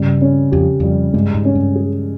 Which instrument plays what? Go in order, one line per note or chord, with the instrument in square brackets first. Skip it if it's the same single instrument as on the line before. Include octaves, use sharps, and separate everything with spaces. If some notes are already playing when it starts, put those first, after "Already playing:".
Already playing: [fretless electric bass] G2 [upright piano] C#3 G3
[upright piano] C#4
[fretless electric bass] F2 [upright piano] G4
[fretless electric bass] F2 [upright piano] G3
[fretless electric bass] G2 [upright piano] G#3
[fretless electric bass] G#2
[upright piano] C#4
[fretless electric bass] G2
[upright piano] G#4